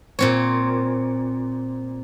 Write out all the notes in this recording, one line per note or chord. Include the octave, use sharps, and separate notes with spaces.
A#2 C4 C#5